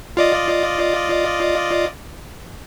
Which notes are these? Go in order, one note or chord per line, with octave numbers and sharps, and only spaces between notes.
F4 D5 D#5